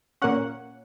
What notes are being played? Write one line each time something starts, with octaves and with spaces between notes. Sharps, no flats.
A#2 A#3 C#4 F#5